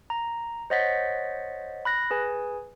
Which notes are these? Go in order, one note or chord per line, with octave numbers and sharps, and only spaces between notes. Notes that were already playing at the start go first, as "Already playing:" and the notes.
A#5
C5 C#5 D#5 F#5 A6 B6
B5 F#6 A#6
G#4 B4 G#5